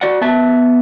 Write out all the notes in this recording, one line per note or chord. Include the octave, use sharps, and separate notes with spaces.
F#4 D5 F#5
B3 B4 E5 A5